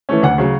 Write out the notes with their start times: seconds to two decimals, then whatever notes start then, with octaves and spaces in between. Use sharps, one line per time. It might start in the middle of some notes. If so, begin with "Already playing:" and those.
0.09 E3 A3 C#4
0.23 D2 F#5
0.38 C#3 F#3